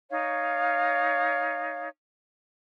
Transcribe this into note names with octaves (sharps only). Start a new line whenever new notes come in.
D#4 C#5 F5